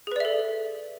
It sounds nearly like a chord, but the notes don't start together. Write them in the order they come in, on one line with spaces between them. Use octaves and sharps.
G#4 B4 D5 E5 A4